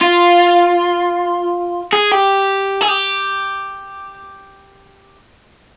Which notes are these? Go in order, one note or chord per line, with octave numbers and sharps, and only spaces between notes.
F4
G#4
G4
G#4
G4